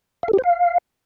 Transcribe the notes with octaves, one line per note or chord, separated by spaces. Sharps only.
F5
A4
G4
C5
F5